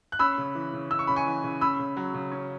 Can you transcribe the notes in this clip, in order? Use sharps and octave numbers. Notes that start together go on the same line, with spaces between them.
F#6
C#4 B5 E6
C#3
E3
C#3
C#4 E6
C#6
C#3 B5
G#5 C#6
E3
C#3
C#4 B5 E6
C#3
F#3
C#3
C#4